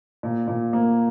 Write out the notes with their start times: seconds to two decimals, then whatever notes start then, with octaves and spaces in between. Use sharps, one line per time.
0.23 A#2
0.47 A#2
0.73 A#3